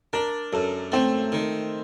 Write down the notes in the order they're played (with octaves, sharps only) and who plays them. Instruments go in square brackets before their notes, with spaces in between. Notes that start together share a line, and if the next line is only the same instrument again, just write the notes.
[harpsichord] D4 [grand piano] A#4
[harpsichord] F#2 [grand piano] A4
[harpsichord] A3 [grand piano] C4
[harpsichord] D#3